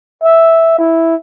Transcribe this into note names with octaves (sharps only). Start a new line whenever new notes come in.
E5
E4